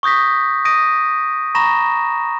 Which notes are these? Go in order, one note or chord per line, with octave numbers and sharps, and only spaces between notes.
C#6 D#6 G6 A#6 B6
D#6 A#6 D7 D#7
A#5 B5 C#6 A#6 E7